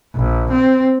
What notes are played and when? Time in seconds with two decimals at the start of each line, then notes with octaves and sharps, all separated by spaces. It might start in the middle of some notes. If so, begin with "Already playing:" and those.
0.15 A#1
0.52 C4